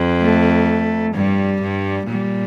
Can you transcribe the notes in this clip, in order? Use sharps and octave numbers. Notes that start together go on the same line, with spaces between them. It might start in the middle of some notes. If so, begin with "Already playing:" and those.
Already playing: F2
A3
G2 G3
G2
A#2 G3